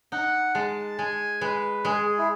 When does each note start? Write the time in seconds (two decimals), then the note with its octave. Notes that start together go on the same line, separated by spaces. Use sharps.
0.12 D#4 F#5
0.55 G#3 A5
0.98 G#3 G#5
1.41 G#3 B4
1.85 G#3 G#4
2.06 G#4
2.18 E4